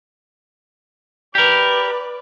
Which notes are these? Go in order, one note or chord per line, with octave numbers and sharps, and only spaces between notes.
G4 A#4 B4 D5